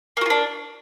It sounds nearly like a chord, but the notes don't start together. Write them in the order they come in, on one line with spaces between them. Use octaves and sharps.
A#3 F#4 F4 D4